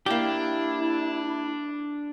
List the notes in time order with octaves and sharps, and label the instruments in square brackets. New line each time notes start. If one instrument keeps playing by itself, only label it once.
[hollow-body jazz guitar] A#3 G4 [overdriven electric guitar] D4 [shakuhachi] E4